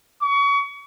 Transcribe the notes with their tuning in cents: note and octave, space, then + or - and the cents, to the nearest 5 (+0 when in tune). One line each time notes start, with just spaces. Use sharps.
C#6 +30